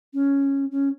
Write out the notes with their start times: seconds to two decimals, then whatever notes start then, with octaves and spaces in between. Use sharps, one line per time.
0.14 C#4
0.72 C#4